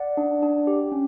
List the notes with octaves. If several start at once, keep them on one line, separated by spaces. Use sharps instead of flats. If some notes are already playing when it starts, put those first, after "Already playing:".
Already playing: D5 F#5
D4
D4
G4
C#4